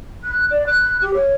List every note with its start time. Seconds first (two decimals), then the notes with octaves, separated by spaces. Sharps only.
0.23 F#6
0.50 D5
0.66 F#6
1.01 G4
1.13 C#5